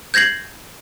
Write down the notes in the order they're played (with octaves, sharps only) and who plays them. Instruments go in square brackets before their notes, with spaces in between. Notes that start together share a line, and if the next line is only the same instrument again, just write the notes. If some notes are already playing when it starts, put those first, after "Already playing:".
[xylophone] G6 G#6 A#6 C7 F#7